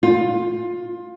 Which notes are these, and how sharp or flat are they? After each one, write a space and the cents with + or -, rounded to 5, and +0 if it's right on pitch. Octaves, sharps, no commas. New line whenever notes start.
F4 +20